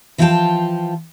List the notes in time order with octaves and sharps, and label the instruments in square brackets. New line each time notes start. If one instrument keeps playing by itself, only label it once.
[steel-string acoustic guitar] E3 F3 F4 F#5 G5 A5